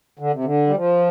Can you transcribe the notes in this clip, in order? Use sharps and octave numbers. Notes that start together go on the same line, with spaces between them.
D3
C3
D3
G3
F3